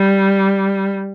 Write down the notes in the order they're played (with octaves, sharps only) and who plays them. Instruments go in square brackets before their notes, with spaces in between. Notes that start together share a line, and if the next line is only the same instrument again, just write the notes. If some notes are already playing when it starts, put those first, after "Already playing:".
Already playing: [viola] G3